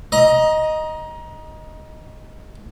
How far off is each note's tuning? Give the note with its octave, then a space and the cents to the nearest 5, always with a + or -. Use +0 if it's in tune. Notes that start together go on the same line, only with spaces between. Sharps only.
D#5 +0 A#5 +25 D#6 +0